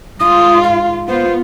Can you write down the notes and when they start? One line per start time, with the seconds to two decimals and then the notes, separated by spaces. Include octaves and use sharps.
0.20 G#2 F4 D#6
0.62 F5
1.08 B3 F4 C5